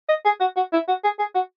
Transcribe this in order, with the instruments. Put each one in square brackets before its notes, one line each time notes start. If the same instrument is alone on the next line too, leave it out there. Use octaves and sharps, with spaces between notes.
[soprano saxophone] D#5
G#4
F#4
F#4
E4
F#4
G#4
G#4
F#4